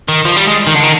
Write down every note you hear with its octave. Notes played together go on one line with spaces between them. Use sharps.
D#3
F3
G3
G#3
D#3
D3
D#3